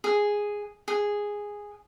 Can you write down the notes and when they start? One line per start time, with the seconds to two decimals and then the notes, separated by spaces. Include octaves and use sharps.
0.04 G#4
0.88 G#4